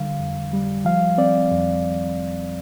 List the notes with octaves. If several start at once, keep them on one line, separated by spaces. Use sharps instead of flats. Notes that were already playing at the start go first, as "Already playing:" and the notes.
Already playing: D3 G3 F5
F2
G3
F3 F5
C4 D5
F2